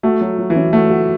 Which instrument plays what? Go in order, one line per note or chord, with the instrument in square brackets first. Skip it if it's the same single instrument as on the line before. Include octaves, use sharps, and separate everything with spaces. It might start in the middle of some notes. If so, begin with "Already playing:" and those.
[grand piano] A3 [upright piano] F#4
[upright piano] F#3
F#3
[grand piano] E3
[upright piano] C#4
[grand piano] A3 [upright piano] F#4
[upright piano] F#4